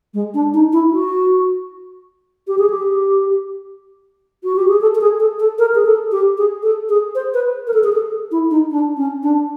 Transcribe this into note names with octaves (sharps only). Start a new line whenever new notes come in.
G#3
D4
D#4
E4
F#4
G4
G#4
G4
F#4
G4
G#4
A4
A4
G#4
A4
A4
A#4
G#4
A4
G4
G#4
A4
G#4
C5
B4
A#4
A4
G#4
A4
E4
D#4
D4
C#4
D4